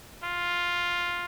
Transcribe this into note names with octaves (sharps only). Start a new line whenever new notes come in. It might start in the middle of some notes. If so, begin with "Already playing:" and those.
F4